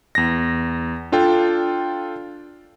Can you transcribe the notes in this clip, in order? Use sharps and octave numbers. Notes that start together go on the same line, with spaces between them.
E2 A#6
D4 F4 A4 G5